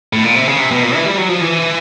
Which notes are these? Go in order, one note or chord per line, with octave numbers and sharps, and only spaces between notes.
A2
A#2
C3
C#3
C3
B2
A#2
E3
G3
F#3
F3
E3